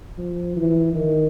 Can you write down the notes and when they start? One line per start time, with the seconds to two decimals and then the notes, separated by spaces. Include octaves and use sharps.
0.18 F3
0.56 E3
0.94 D#3